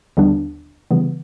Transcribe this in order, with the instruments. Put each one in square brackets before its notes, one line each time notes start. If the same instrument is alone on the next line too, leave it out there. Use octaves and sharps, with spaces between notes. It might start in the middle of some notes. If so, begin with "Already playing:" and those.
[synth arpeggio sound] D#2 D3 G3 B3 D4
C#3 E3 G3 B3